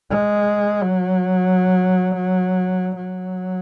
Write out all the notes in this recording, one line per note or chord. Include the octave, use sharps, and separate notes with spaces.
G#3
F#3
F#3